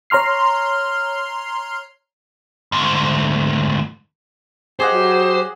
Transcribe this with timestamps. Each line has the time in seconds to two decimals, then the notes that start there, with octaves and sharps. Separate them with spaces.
0.10 C#5 A#5 C6 F6 C7
2.72 D2 G#2
4.80 G4 G#4 C5 D#5 F#5
4.93 F#3